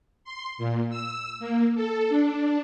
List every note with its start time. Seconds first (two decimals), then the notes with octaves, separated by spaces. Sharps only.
0.25 C6
0.58 A#2
0.90 E6
1.40 A#3
1.75 A4
2.10 D4